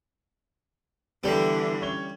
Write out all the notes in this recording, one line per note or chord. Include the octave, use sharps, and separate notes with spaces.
D3 E3 G3 B3 A4 G5
C#4 C#5 G7